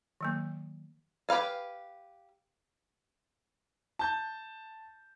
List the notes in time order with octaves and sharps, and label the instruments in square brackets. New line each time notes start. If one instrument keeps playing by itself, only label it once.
[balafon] D#3 F#3 A#3
[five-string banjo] G4 B4 F5 G#5
[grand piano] A5 G6